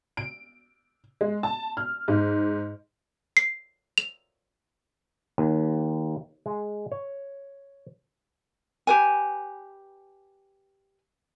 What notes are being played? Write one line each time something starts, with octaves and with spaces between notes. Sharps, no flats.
D7
G#3
A5
F6
G#2
C7
F7
D#2
G#3
C#5
G4 B4 G#5